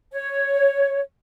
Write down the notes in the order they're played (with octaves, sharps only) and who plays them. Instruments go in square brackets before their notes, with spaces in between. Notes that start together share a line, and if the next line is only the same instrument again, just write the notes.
[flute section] C#5